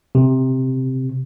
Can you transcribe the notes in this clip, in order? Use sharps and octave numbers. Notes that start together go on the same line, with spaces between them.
C3